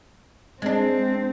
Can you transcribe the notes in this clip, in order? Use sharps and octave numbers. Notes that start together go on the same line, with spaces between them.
G#3 C4 D4